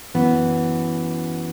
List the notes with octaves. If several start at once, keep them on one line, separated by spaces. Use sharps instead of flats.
F#2 E3 B3